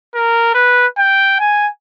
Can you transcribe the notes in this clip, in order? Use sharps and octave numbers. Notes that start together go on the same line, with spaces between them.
A#4
B4
G5
G#5